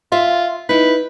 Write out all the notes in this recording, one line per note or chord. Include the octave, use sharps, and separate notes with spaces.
F4 E5
D#4 E4 B4